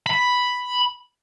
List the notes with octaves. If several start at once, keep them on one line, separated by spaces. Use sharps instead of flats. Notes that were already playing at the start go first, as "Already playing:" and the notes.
B5